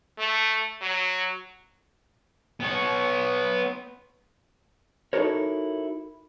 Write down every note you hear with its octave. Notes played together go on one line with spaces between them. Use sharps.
A3
F#3
B3 C#5
D#4 E4 F#4 A4 A#4 C#5